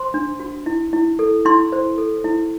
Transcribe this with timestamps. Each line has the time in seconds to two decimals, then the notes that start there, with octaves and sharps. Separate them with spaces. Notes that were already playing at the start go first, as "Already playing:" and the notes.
Already playing: C5 C6
0.14 D4
0.40 F#4
0.66 E4
0.93 E4
1.19 A4
1.45 E4 C6
1.72 C5
1.98 A4
2.24 E4